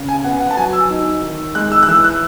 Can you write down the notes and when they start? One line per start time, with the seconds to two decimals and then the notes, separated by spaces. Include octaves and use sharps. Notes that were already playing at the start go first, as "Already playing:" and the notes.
Already playing: C#3
0.09 G#5
0.24 B3 F#5
0.40 F#5
0.51 A5
0.57 F#3 G#5
0.73 E6
0.90 D#4
1.22 D#3
1.55 G#3 F#6
1.72 E6
1.83 F#6
1.88 E3 E6
2.04 F#6